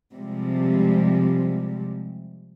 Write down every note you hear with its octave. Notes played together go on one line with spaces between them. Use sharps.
C3 F3 G3 G#3